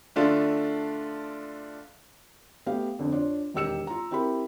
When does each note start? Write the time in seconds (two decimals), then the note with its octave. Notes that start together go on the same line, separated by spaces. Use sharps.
0.16 D3 A3 D4 F4
2.67 A3 B3 G4 F5
2.99 F2 D3
3.12 D4 F4 C#5
3.54 E1 D#3 G4 E6 C#7 E7
3.87 F4 A#5
4.11 C4 E4 G4 A#4 B5